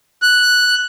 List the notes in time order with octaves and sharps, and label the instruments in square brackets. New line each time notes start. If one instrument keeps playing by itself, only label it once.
[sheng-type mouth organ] F#6